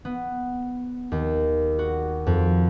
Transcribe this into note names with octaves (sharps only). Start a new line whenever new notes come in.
B3
D#2
F#4
F2